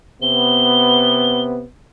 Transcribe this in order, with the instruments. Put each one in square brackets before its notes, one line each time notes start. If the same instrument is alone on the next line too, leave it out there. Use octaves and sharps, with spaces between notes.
[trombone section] C3 B3 [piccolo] G7